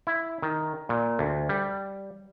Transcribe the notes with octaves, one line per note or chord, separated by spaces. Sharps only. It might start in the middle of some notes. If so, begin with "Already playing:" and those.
E4
D#3
A#2
D2
G3